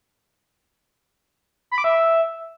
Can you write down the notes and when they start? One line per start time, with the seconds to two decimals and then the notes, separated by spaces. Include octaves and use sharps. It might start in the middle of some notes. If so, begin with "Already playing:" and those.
1.71 B5
1.78 D6
1.84 E5